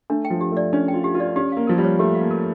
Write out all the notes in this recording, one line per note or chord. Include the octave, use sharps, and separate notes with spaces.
A3 D4
G5
F3
G4
A3 D5
C#4 D4
G5
F4
G4
F4
D5
C#4 G4
A#3 F5
F3 A#4
G3
C#5
A3 G4
F5
A#3
A#4